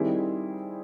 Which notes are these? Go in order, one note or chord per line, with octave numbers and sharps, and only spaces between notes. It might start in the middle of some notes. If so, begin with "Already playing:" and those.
Already playing: D#3 G3 C4 E4 G#4